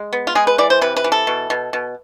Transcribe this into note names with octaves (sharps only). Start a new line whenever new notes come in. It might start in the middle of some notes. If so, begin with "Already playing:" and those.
Already playing: G#3
B3
F4
G#3 G#4
B4
E3 D5
C5
C3 B4
B4
E3
A4
B2
B2
B2